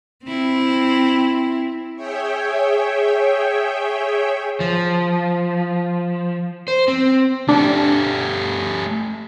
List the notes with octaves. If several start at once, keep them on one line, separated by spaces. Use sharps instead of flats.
C4 E4
G#4 C#5 E5 G5
F3
C5
C4
A3 D4 G4